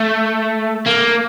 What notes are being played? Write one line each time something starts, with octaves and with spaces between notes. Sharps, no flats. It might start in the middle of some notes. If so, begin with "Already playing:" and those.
Already playing: A3
A#3